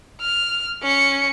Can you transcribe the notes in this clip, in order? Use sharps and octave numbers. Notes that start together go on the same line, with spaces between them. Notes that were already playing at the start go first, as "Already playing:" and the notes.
F6
C#4 C#7